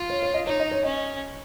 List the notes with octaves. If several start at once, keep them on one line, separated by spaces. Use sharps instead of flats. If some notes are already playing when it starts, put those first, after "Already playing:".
Already playing: F4
C#5
C#5
D#5
D#4 C#5
D#5
C#5
C#4 D#5